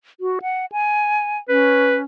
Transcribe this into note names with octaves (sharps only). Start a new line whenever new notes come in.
F#4
F#5
G#5
C#4 B4